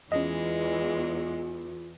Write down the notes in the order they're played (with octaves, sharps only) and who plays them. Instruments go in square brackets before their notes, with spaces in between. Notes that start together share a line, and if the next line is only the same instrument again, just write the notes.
[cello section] E2 [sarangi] G#3 [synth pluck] C#4 D#5 [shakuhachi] F4